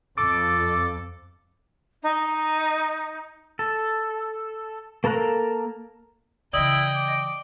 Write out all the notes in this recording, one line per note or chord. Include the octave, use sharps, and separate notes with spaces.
F2 A4 D6
D#4
A4
A#3 A4 A#4 A#5 F#6
C#3 E3 E4 D5 D#5 G5 D#6 F#7
D6